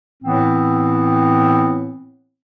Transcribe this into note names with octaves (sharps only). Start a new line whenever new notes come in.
A2 E3 B3 C4